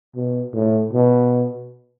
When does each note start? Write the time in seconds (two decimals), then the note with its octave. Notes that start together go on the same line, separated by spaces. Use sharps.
0.16 B2
0.54 A2
0.93 B2